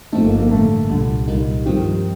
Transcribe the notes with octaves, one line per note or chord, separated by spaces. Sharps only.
G1 G2 F3 A3 C4 D#4
A#3
A#3
A1 G2 D3 A3
C2 A#2 D3 G3
C2 A#2 G3 A#3 D#4
G2 D#3 F3 C4 G4